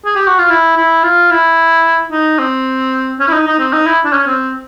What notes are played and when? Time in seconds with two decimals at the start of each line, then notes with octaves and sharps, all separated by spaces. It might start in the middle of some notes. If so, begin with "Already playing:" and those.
0.05 G#4
0.15 G4
0.27 F#4
0.39 F4
0.50 E4
0.77 E4
1.03 F4
1.31 E4
2.12 D#4
2.39 C4
3.20 C#4
3.28 E4
3.33 D#4
3.47 D#4
3.59 C4
3.73 D#4
3.87 E4
4.05 D4
4.13 C#4
4.27 C4